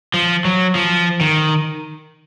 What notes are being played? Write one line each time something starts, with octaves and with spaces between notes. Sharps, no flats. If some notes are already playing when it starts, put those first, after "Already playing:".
F3
F#3
F3
D#3